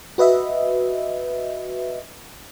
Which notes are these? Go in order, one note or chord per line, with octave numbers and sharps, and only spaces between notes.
F#4 B4 D#5 E5